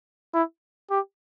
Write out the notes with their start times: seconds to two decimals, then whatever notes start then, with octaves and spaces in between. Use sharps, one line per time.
0.34 E4
0.90 G4